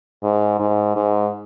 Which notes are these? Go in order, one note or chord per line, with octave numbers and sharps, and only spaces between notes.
G#2
G#2
G#2